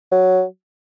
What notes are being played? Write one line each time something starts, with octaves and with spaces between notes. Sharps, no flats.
F#3